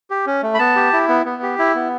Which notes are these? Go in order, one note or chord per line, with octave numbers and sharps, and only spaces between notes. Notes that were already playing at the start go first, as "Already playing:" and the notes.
G4
C#4
A3
B5
B3 A5
G4
E4
B3
B3
G4
E4
B3